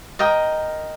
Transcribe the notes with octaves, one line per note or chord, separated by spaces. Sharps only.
A#4 D#5 G5 D#6